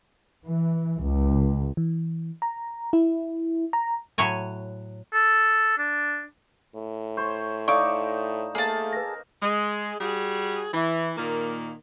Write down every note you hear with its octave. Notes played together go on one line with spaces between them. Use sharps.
E3
C#2
E3
A#5
E4
A#5
A2 F#3 C#5 G#5
A4
D4
A2
C5 C#5 C#6
D#4 A4 D5 F5 C#6 D6
A3 A#3 G#4 A5
B4 A#6
G#3
G3 F#4 G#4
E3
A#2 D#3 A#3